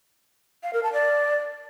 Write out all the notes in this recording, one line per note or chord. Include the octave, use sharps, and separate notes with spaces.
F5
A#4
A5
D5